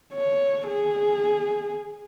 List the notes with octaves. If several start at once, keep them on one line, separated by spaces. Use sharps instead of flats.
C#5
G#4